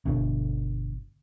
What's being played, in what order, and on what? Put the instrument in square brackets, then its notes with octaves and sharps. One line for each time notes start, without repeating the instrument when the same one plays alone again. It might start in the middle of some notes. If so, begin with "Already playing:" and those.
[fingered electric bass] G1 B2 D3